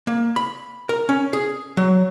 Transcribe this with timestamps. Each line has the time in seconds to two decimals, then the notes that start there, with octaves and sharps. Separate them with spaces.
0.07 A#3
0.36 B5
0.89 A#4
1.09 C#4
1.33 G#4
1.77 F#3